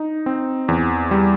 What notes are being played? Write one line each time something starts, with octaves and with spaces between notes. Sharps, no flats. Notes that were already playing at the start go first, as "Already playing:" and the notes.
Already playing: D#4
C4
E2
G3